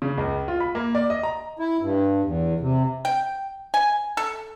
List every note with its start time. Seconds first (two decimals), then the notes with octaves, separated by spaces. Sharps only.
0.02 C#3
0.18 C#2
0.48 F4
0.60 B5
0.75 A#3
0.95 D5
1.10 D#5
1.23 A#5
1.59 E4
1.81 G2
2.24 E2
2.60 C3
3.05 G5
3.74 G#5
4.17 A4